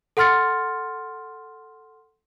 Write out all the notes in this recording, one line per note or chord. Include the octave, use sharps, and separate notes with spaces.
A4 F#5 C6 F6 A6 C#7